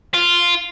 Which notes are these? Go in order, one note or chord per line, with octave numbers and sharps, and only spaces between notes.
F4